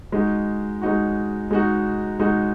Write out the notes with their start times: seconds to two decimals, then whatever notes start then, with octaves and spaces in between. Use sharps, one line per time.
0.12 G#3 D#4 F#4
0.82 G#3 D#4 F#4
1.51 G#3 D#4 F#4
2.20 G#3 D#4 F#4